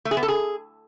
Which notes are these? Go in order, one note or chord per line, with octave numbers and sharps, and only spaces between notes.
A3
G#4
B3
A4
G#4